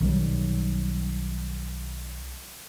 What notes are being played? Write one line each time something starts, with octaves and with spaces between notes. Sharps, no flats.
B1 D#3 F#3 G3